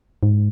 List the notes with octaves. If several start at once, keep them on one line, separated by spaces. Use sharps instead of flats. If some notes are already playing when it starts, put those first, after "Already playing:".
G#2